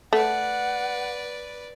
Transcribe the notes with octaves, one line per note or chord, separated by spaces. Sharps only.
A3 B4 D5 F#5